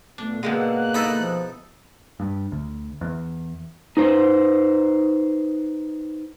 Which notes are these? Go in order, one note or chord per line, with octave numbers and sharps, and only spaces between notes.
A#2 A3 B3 D4
B2 D3 G#3 A#3 F#5 E6
F#6
D#4 E4 A4 D#5
F3
G2
D2
E2
D#4 B4 C5